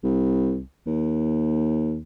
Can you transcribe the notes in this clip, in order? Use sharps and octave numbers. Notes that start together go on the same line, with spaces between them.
C2
D#2